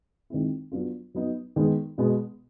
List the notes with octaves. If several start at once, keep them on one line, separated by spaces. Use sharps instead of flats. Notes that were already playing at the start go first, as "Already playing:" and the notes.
D#3 G#3 C4 E4
F#3 B3 D4 F4
F#3 B3 D#4
D#3 G#3 B3
B2 G#3 B3